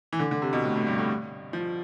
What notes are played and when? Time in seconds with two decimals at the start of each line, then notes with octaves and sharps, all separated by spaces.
0.13 E3
0.19 D3
0.31 D3
0.42 C3
0.53 B2
0.64 A2
0.76 A2
0.87 G2
0.98 A2
1.53 F3